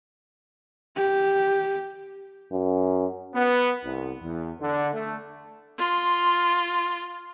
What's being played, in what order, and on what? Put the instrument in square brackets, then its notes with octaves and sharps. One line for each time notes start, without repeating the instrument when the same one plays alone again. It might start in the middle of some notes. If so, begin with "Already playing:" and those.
[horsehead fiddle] G4
[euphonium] F#2
[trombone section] B3
C2
E2
D3
A3
[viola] F4 C6